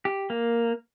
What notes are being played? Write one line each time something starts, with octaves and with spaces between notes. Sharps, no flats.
G4
A#3